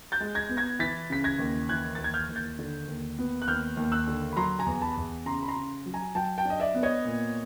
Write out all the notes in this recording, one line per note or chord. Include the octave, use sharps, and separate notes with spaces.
G6 A6
G#3
G#6 A#6
B3
G#6 A#6
E3 A6 B6
C#3 B6
G#6 A#6
D#2
E3 F#6 G#6
D#2 A6
G#6
F6 G6
D#2
G6 A6
D3
D#2
B3
F#6
D#2 F6 G6
D#2
E6 F#6
D3
B5
F#3 A#5 C6
G#5 A#5
E2
A5 B5
E2
C#3 A#5 C6
B5
A#5 C6
C#3
F#3
G#5 A#5
F#3 G5 A5
G5 A5
D4
D#5
D5 E5
B3
C#5 D#5
A#2